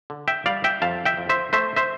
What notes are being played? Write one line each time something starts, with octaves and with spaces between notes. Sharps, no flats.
D3
E5 G5
G3 D5 F5
E5 G5
F2 F5 A5
E5 G5
F2
C5 E5
A3 C5 E5
C5 E5